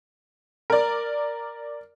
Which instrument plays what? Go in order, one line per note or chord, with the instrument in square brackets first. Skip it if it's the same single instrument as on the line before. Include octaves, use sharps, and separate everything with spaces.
[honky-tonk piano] A#4 D5